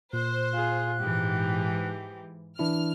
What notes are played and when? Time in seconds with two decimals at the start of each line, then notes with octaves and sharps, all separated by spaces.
0.13 A#2 C5 F#6
0.54 F4 G#4
1.00 G#2 E3 G4
2.59 E3 D4 E4 F6